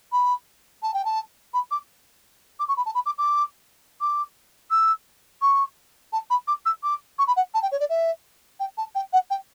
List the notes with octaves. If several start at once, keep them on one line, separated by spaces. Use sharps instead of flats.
B5
A5
G5
A5
B5
D6
D6
C#6
B5
A5
B5
D6
D6
D6
E6
C#6
A5
B5
D6
E6
D6
C#6
B5
F#5
A5
G5
C#5
D5
E5
G5
A5
G5
F#5
G5